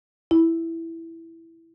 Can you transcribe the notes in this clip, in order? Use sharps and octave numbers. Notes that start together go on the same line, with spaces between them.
E4